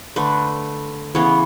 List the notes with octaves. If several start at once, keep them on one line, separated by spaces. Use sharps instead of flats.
D3 A3 B4
C#3 E3 B3 C#5